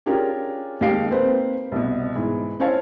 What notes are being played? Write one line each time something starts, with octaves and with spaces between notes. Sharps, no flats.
C#4 D4 F4 G4 G#4 A#4
D#2 G#3 G4 F5 C7 D7
A#3 C4 B4 C5
C2 B2
G#2 E3
C#4 E4 C5 C#5 F5 A5